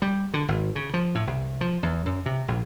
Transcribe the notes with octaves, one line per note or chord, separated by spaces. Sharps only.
G3
D3
G#1
C#3
F3
A2
C2
F3
E2
F#2
C3
A#1